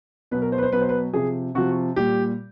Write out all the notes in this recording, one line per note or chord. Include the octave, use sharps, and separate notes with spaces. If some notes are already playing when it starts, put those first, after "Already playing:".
B2 F#3 B4
A#4
C5
B4
C5
B2 F#3 B4
C5
B4
C3 F3 G#4
C3 F3 F#4
A#2 G3 G4